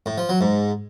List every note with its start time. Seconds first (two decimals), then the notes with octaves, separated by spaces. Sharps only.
0.06 A2
0.18 F3
0.29 F#3
0.41 G#2